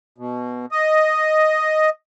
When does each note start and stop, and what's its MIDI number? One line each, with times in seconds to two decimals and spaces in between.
0.18 0.66 47
0.72 1.90 75